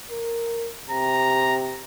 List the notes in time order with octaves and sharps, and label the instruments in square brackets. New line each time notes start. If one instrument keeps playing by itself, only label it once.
[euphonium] A#4
[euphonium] C3 [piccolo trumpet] A#5